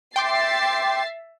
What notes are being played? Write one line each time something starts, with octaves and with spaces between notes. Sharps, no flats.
E5 G5 C6 D6 A6 C7